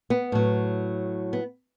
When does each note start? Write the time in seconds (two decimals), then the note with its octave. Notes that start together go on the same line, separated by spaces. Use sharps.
0.10 B3
0.32 A2 F#3
1.33 B3